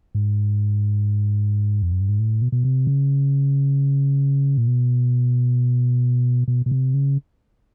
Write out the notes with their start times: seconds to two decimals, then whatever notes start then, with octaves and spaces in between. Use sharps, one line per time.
0.15 G#2
1.83 F2
1.91 F#2
2.01 G2
2.09 G#2
2.19 A2
2.42 B2
2.52 B2
2.65 C3
2.87 C#3
4.58 A#2
4.67 B2
6.48 B2
6.66 B2
6.71 C3
6.94 C#3